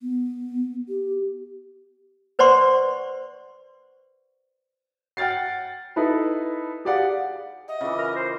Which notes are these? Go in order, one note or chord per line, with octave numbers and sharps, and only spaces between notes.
B3
G4
B4 C5 D5 F#5 C6 C#6
F#5 G5 F6 A6 C7
D#4 E4 A4 B4
G4 G#4 D5 F5 F#5
D#5 E5 F#5
C#3 E3 F4 C#6 D6
A#4
C5